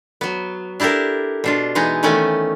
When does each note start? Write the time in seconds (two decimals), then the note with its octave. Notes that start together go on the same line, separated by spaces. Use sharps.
0.21 F#3 B3
0.80 D4 E4 G4 A4 A#4
1.44 B2 D4 F4
1.75 E3 G#3 B3 D#4
2.03 D#3 E3 A3 B3 C#4 D5